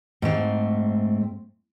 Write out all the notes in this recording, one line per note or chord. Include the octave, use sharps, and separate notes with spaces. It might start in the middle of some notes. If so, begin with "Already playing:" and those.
G#2 A3 C4